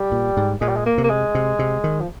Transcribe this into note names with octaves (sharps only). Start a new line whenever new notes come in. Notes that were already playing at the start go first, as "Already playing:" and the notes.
Already playing: G3
A#2
G#2
A#2 G#3
G3
G#3
A#3
C3
A#3
G#3
C3
C3
D#3
F3